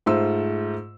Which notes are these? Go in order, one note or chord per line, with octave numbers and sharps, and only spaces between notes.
G#2 A3 F4 C5 E6